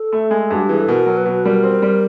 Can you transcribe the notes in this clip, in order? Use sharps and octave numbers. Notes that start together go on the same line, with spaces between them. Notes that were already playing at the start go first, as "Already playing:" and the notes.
Already playing: A4
A3
G#3
G2 F#4
G4
E3 G#4
A4
B2 A#4
F#3
B4
B2
G3 A#4
C4
G3